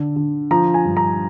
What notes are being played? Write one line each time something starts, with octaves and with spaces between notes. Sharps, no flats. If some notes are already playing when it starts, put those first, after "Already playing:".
Already playing: D3
D3
F3 A#5
G#5
G2
A#5